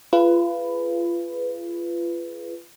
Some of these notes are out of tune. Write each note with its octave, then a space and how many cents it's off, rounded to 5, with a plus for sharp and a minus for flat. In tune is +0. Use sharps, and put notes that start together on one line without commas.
F4 -30 G#4 +25 B4 +10